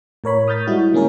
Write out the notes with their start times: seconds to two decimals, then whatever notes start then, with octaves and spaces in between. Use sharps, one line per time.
0.24 A2 A#4 C#5 B5
0.48 D#6 F6 G6 A6 B6
0.67 G3 G#3 E4 F#4
0.93 D3 A#3 C#4 G#4 A#4